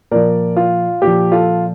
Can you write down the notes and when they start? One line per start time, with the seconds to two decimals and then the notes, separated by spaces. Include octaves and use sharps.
0.11 A#2 F3 A#4 D5
0.57 F4
1.02 A#2 F3 G4
1.32 F4 A4